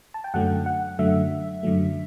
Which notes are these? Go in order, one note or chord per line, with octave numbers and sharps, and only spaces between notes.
A5
G5
F#2 D3 F#3 A3 F#5
F#5
F#2 D3 F#3 A3 E5
F#2 D3 F#3 A3